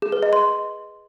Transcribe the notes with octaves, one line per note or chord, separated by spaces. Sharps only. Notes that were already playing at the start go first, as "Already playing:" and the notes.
G#4
B4
D#5
C6